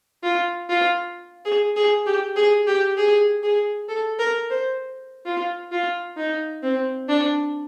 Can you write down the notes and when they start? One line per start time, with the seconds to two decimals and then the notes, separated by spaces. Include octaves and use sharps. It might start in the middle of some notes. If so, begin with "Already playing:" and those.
0.23 F4
0.69 F4
1.45 G#4
1.76 G#4
2.06 G4
2.36 G#4
2.67 G4
2.97 G#4
3.43 G#4
3.89 A4
4.19 A#4
4.50 C5
5.26 F4
5.72 F4
6.17 D#4
6.63 C4
7.08 D4